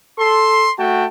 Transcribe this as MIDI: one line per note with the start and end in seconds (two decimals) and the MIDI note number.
0.19 0.70 69
0.19 0.70 84
0.79 1.06 57
0.79 1.06 66
0.79 1.06 79
0.79 1.06 81